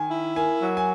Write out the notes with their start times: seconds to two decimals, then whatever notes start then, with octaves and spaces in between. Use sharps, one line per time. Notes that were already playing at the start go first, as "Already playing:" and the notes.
Already playing: D#3 G#5
0.10 E4
0.36 A#3 G#5
0.62 F#3
0.77 G#5